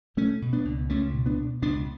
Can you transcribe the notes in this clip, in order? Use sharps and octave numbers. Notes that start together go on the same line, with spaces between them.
B2 A3 C#4
B2
B3 D4
C#2
C#2 A3 C#4
B2
B3 D4
B2
C#2 B3 D4